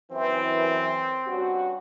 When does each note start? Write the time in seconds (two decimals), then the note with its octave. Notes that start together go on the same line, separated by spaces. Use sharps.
0.12 F#2 E3 C4
1.27 G2 C#4 F#4